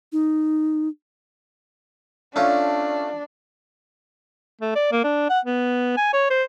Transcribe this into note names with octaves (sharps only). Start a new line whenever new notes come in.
D#4
A3 C#4 D4 F4
A3
D5
A#3
D4
F#5
B3
G#5
C#5
C5